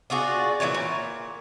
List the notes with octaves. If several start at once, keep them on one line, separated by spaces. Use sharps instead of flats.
D4 F4 F#4 G#4
A#2 E3 E4 C#5
A#2